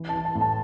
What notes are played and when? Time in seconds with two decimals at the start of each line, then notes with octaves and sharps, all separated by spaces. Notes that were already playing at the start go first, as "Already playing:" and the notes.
Already playing: E3
0.09 A5
0.14 E3
0.25 A5
0.35 A2
0.41 A5